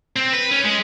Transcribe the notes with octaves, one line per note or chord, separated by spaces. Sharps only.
C4
B4
C#4
G#3